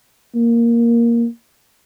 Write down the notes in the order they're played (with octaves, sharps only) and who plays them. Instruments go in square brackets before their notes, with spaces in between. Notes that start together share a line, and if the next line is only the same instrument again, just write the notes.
[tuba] A#3